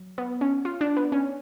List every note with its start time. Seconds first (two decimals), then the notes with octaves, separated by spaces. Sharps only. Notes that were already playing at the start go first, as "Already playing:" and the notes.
Already playing: F#3
0.18 B3
0.41 C#4
0.65 F4
0.81 D4
0.97 B3
1.12 C#4